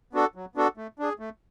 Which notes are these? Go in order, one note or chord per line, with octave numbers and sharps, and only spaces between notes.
B3 D4 F#4 A4
F#3
B3 D4 F#4 A4
A3
D4 G#4
A3